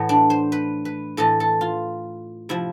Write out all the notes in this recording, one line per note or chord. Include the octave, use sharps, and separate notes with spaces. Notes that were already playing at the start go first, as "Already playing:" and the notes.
Already playing: A2 E3 B3
D4
C5
B4
B4
A2 E3 A4
A4
F4
C3 F3 E4